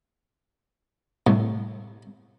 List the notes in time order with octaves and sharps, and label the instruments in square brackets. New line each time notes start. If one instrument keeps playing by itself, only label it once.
[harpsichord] C2 [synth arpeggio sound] A2